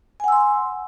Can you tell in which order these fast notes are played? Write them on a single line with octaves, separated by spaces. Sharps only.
G#5 F#5 E6 C6